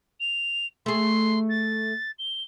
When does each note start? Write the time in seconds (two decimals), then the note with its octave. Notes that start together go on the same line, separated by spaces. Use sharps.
0.20 F7
0.86 A3 G#4 C6
1.49 A6
2.19 G7